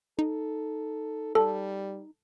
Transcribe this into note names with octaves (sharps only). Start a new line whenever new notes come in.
D#4 A4
G3 A4 A5